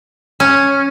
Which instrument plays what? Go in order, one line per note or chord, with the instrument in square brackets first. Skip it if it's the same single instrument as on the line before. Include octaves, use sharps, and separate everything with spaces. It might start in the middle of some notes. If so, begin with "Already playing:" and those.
[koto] C#4